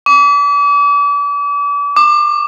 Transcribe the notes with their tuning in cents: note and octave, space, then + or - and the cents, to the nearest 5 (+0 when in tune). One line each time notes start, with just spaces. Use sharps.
D6 -35
D6 +30